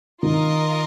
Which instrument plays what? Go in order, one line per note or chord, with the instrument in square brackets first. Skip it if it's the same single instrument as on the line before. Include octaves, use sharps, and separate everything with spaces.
[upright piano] D#3 [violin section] F4 A#4 D#5